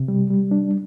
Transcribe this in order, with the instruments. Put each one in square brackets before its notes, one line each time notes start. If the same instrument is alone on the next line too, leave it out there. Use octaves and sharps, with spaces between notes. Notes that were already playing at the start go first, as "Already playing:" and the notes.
Already playing: [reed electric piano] C3
G3
G3
D4